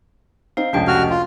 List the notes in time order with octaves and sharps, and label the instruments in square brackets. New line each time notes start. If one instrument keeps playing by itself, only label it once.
[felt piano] C4 D#4 [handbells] F5
[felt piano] F1 C#2 C3 [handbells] C#4 D4 G5
[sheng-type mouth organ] F#4 F6
F4